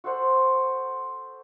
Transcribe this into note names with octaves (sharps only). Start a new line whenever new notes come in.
F#4 A4 C5 F#5